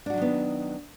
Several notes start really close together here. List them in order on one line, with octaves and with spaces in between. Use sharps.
D4 F#4 F#3 D#3 B3